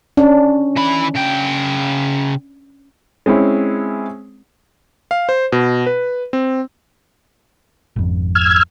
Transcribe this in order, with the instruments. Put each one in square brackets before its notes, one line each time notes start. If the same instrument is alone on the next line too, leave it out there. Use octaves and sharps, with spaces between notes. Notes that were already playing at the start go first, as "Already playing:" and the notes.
[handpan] C#4 D4
[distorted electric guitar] E3 B5
C#3 G5
[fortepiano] G#3 C4 C#4 E4
[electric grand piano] F5
C5
B2
B4
C4
[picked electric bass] G#1 F2
[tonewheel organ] E6 F6 G#6